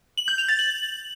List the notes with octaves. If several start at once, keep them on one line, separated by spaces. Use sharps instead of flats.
F#7
G6
F7
A6
F#7